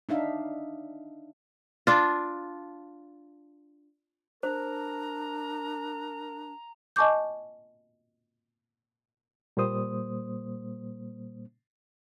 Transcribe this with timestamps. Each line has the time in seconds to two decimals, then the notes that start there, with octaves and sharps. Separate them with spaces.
0.09 D4 D#4 E5 F5
1.87 D4 F4
4.43 D4 A#4 C5 A#5
6.96 D#5 G#5 A5 C#6 D6 G6
9.57 A#2 G3 A#3 C5 D#6